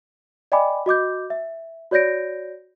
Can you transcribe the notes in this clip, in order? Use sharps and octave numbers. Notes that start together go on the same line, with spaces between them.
D5 D#5 G5 G#5 B5 D6
F#4 D#5 D6 G6
E5
F#4 C#5 D5 G6 A#6 D7